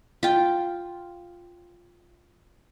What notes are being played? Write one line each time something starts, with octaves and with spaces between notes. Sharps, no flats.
F4 G5